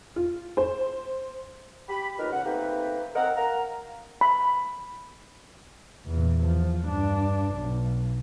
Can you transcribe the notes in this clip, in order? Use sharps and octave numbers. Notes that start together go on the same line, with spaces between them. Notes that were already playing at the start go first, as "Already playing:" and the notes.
F4
C5
G4 B5
D#2 B2 D#3 F4 A#4 B4
C#2 F#5
A3 A#3 C4 D#4 G4 B4
C4 A#4 D#5 F#5
A#4 F5 F#5 A#5
B5
E2 A#2
F3
G2 D4
B1